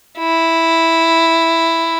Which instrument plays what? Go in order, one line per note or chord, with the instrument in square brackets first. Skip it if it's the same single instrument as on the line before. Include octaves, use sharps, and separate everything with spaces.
[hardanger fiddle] E4